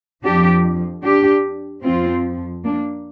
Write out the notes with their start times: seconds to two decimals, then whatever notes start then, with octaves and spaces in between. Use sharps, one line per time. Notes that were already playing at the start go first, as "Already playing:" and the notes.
0.23 F2 F3 D4 G4
1.03 D4 G4
1.83 F2 F3 C4 F4
2.64 A#3 D4